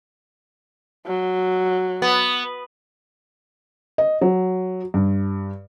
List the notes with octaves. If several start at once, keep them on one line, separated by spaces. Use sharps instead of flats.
F#3
B3
D#5
F#3
G2